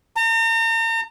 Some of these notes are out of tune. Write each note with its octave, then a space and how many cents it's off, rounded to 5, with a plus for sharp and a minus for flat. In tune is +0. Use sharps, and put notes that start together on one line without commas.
A#5 -40